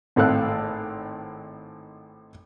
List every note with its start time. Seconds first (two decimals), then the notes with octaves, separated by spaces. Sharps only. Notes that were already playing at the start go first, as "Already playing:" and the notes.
0.16 G#1 A2 C4 A4 F5 F#6